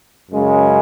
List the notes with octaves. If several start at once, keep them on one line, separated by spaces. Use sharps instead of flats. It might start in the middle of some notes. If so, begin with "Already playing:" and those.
F#2 C#3 G#3